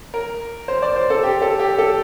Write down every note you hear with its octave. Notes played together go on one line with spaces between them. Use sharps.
A#4
C5
D5
C5
A4
G4
A4
G4
A4